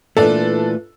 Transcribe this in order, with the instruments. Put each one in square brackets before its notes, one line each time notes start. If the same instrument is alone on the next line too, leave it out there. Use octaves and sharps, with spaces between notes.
[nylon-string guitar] A#2 E3 [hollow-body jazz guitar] A3 [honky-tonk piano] D4 A4